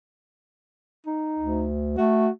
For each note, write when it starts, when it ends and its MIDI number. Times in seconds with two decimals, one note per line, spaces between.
1.06 1.67 63
1.39 1.95 38
1.97 2.28 57
1.97 2.31 66